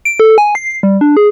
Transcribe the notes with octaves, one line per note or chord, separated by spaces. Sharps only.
D7
A4
G#5
C7
G3
D4
G#4